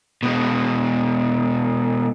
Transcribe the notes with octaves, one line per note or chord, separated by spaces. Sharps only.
B2 G#3